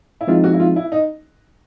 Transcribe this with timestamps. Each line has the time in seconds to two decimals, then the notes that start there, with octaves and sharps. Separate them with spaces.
0.21 E4
0.27 F3 G#3 C4 D#4 F4
0.44 F#4
0.54 E4
0.60 F4
0.76 E4
0.92 D#4